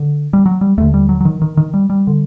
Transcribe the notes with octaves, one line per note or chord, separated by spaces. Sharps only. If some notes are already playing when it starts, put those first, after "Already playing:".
Already playing: D3
G3
F#3
G3
D#2 D3 A3
G3
F#3
F#3
D#3
D#3
D#3
G3
G3
D3